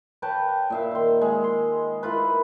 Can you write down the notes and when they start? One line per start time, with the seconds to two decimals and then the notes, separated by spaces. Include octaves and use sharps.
0.22 B4 C#5 G5 A5
0.70 A#2 E5 F5
0.91 D#3 C6
1.21 G#3
1.44 C6
2.03 A#3 E4 F4 B4